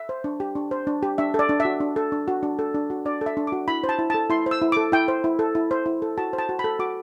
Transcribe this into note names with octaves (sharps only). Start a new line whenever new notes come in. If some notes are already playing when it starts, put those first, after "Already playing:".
Already playing: E5
C5
D4
G4
D4
C5
D4
G4
D4 E5
A4
D5
D4
E5
F#4
D4
A4
D4
F#4
D4
A4
D4
F#4
D4 D5
A4
E5
D4
F#4 D6
E4 B5
C5
A5
E4
A4 A5
E4 C6
C5
E6
E4
A4 D6
E4 G5
C5
E4
A4
E4
C5
E4
A4
F#4 A5
C5
A5
F#4
B5
A4
F#4 D6